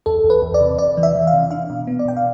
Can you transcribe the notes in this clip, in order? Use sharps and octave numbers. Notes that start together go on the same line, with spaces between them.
E2 A4
E2
B4
E2
D5
C3
E2 D5
E3
E5
E3
F5
C3
D4 F5
B2
B3
D5
B2 G5
F5